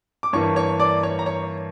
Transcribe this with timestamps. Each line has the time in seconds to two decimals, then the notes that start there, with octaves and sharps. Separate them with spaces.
0.23 D6
0.33 G2 E3 A#3 C#5 C#6
0.56 C#5 C#6
0.80 D5 D6
1.03 C#5 C#6
1.19 A#5
1.26 C#5 C#6